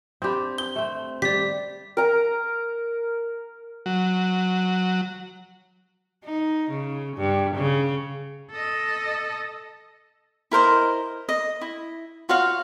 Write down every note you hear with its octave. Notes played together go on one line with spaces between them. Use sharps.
C4 D4 G4 B5 G6
G6 G7
A3 C4
G3 G4 D5 B6
A#4 A#5
F#3
D#4
C#3
G2
C#3
A4 D#5
E4 A#4 C5 D#5
D#5
E4
F4 F#4 C#5 F5